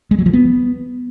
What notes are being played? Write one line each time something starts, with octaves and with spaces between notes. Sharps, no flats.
G#3
F#3
F3
B3